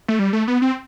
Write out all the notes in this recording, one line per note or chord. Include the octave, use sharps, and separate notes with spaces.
A3
G3
A3
B3
C4